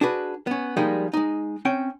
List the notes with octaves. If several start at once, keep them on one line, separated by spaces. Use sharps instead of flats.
D4 F#4 G#4 B4
B3 C#4
F3 G3 G#3 A#3 D#4 G4
G#3 D#4
C4 C#4 G5